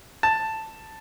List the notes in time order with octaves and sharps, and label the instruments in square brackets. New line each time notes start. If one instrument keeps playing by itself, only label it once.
[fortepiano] A5